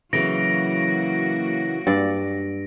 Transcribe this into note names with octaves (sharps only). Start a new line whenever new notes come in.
C#3 E3 F#3 A#3 F#4 A#6 D7
G2 D5